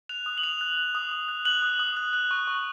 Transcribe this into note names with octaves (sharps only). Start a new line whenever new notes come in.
F#6 F7
D#6
F#7
D#6 F7
F#6
F#6
D#6
D#6
F#6
F#6 F#7
D#6
D#6
F#6
F#6
C#6
C#6